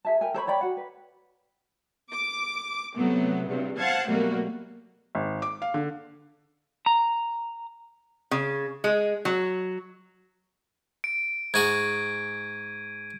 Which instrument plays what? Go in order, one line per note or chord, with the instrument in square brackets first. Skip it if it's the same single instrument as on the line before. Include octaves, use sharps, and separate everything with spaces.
[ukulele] G#4 E5 A5
A#4 G5 G#5
A4 C5 C#5 B5
C#5 D5 G5 B5
F#4 F#5
B4
[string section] D6
C3 F#3 A3 B3
E2 G2 C3 F#3
C5 F5 F#5 A5 G#6
B2 F#3 G3 A3 A#3 F#4
[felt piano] G#1
D6
F5
D3
[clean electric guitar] A#5
[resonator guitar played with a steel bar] C#3
G#3
F#3
[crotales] D7
[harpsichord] G#2 F#4 G#4 [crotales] G#6 D#7